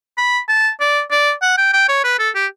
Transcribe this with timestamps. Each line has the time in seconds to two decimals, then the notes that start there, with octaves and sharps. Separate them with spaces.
0.17 B5
0.49 A5
0.80 D5
1.11 D5
1.42 F#5
1.57 G5
1.73 G5
1.88 C#5
2.04 B4
2.19 A4
2.35 G4